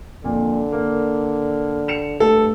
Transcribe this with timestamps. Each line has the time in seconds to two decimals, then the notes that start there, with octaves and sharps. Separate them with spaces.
0.24 F2 A#2 D3
0.72 A#3
1.88 C#7 E7 F7
2.20 G2 A3 A4